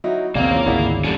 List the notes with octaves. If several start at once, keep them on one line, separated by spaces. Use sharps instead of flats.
F#3 D#4 E4
B1 E2 C#3 A#3 C4 D5 F5
C#4 F4
G#1 D2 E4 G#4 D5 F#5
E2 G3 C#4 D4 A4 D7